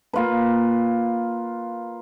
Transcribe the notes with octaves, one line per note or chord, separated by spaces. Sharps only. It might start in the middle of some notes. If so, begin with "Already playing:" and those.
A#3 F4 B4